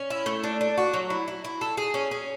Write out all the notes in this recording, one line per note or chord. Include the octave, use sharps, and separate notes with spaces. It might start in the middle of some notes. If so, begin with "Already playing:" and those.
Already playing: C#4
E4
A3
D4
D4
F#4
F#3
E4
E4
E4
A4
G#4
C#4
C#4